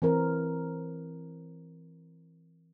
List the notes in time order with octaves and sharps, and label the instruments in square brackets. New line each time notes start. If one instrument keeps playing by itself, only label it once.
[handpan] E3 C4 A#4